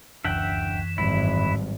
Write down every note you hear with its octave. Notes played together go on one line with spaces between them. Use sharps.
D1 C#2 F#2 E3 D4 E5 F#5 G5
G#1 A2 F#3 G3 E4